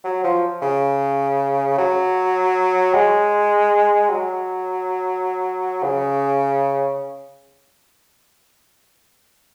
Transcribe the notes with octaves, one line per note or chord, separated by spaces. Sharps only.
F#3
F3
C#3
F#3
G#3
F#3
C#3